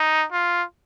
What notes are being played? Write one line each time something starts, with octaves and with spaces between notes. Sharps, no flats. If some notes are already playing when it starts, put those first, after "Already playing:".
Already playing: D#4
F4